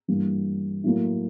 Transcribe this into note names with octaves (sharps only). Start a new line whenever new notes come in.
G2 E3 G3 A#3
A2 F#3 A#3